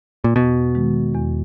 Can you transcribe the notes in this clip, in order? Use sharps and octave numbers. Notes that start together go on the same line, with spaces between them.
A#2
E2 B2
D#3 G#3
E2